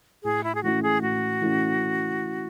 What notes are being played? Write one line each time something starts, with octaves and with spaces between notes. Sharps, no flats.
A2 G#4
E4
G#4
E3 A3 C#4 E4 F#4
G#4
A2 F#4
E3 A3 C#4 E4